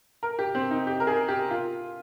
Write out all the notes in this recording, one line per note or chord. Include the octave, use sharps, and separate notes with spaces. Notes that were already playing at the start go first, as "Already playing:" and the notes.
A#4
G4
C4
D#4
G4
A#4
G#4
G4
F4